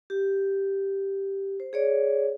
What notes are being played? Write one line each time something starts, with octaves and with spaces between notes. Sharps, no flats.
G4
C5
G#4 C#5 D5